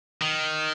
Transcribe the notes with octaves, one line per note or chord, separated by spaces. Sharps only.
D#3